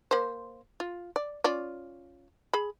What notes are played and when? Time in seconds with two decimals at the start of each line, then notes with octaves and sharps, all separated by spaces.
0.11 A#3 C5
0.80 F4
1.16 D5
1.44 C#4 F4 D5
2.53 G#4 B5